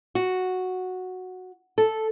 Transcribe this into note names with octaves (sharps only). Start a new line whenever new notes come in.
F#4
A4